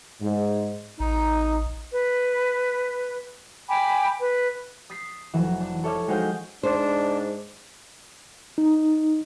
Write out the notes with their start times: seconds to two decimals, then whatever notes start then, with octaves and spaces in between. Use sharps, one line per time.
0.21 G#2
1.00 A1 D#4
1.93 B4
3.69 G5 G#5 B5 D6
4.20 B4
4.90 D#6 A6 B6 C7
5.34 F1 E3 F#3 E5
5.61 D4
5.84 A4 C#5 E5 D6 F6 G#6
6.08 G#3 D#4 F#4 C5 F5 G5
6.63 G#2 D4 C5
8.58 D#4